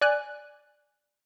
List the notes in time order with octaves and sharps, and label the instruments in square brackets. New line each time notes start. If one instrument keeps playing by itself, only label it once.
[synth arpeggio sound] D5 G#5 F#6